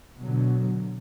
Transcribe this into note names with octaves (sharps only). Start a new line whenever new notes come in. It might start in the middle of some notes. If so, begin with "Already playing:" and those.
B2 D3 F#3